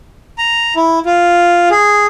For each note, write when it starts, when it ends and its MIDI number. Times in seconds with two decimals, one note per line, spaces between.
0.38 0.74 82
0.76 0.99 64
1.06 1.69 65
1.71 2.07 68